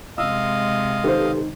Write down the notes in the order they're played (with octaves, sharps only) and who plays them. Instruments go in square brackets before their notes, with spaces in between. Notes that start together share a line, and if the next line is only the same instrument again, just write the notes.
[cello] C3 G#3 [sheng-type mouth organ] D#5 F5 [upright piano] E6
[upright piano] D#3 C5 [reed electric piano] G4 A4 B4